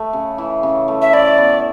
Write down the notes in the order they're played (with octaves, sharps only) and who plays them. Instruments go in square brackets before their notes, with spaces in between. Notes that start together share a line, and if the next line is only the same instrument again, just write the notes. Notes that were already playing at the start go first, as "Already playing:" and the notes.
Already playing: [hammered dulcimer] A3
C#3
E3
C#3
A3
[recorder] E5
[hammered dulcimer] E4 [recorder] D5
[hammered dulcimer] B3